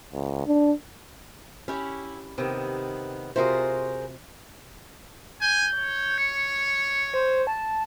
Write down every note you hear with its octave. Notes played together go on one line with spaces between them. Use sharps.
C#2
D4
C#4 E4 G4 C#5
C3 D#3 B3
C3 F4 F#4 G#4 A#4 C5
G#5 G6
C#5
C#7
C5
A5